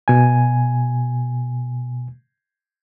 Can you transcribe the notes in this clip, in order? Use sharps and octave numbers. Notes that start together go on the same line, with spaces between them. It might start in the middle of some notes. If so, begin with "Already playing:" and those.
B2 G#5